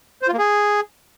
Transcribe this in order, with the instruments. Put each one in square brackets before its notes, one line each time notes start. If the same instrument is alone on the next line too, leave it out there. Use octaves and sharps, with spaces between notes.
[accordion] C5
F4
A#3
G#4